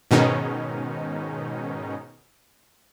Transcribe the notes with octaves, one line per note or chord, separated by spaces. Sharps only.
G#2 B2 D#3 C#4 D#4